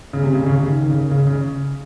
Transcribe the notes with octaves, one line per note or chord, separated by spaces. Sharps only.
C#3
C3
C#3
C#3
C#3
D#3
C#3
C#3
C#3